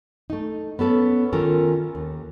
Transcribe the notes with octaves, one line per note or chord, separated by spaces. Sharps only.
A3 D#4
B3 C#4 A4 B4
D#3 C#4 F4 A4 A#4
D#2